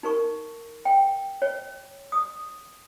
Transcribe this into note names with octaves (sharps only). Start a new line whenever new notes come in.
D#4 A#4 C#6
G5
C#5
D#6